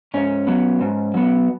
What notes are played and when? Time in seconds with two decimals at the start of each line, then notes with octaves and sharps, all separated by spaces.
0.14 G#2 C#4
0.47 F#3 B3
0.81 G#2
1.14 F#3 B3